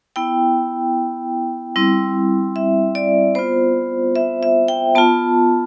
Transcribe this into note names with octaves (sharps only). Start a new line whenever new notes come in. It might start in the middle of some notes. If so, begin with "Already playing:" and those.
B3 E4 G5
G3 C4 E4
E5
D5
B3 F4 C5
E5
E5
G5
B3 F4 A5